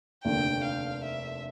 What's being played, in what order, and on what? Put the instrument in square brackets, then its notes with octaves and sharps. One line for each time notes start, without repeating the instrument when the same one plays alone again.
[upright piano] F1 D#2 D3 [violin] G5
[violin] F5
E5